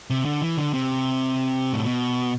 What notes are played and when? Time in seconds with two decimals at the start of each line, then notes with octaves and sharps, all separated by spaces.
0.10 C3
0.25 D3
0.42 E3
0.57 D3
0.74 C3
1.73 A2
1.85 B2